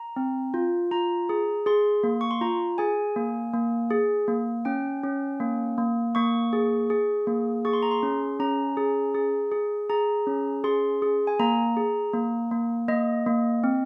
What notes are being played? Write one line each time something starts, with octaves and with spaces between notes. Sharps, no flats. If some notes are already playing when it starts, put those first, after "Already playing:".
Already playing: A#5
C4
F4
F4 A#5
G#4
G#4 C6
A#3
C#6
C6
F4 A#5
G#4 G#5
A#3
A#3
G#4
A#3
C#4 G5
C#4
A#3
A#3
A#3 C#6
G#4
G#4
A#3
G#4 C#6
C6
A#5
C6
C#4
C#4 A#5
G#4
G#4
G#4
G#4 A#5
C#4
G#4 C6
G#4
G#5
A#3 A#5
G#4
A#3
A#3
A#3 D#5
A#3
C4